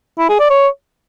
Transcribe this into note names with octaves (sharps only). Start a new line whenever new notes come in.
E4
G#4
D5
C#5